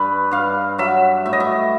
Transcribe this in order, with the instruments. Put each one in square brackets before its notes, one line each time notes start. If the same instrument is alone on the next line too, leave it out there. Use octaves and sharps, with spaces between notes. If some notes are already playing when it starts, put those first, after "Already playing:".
Already playing: [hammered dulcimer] G2 B4
G2 F5
F#3 E5
A2 E5
D#5
E5